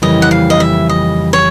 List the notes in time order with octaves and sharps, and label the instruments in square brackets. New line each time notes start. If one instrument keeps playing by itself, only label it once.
[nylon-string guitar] F2 C#3 E3 G3 A#3 [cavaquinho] D#5
[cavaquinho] F#5
F5
D#5
E5
D#5
C#5